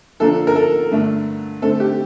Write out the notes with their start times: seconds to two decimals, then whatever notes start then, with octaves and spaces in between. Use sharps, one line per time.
0.20 D3 F3 A#3 D4 A4
0.47 A#4
0.56 A4
0.91 G2 D3 A3 D4
1.62 D3 A3 C4 A4
1.80 G4